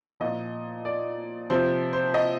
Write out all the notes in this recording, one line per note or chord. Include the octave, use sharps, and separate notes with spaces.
A#2 F3 D#5
D5
C3 F3 C5
C5
D#5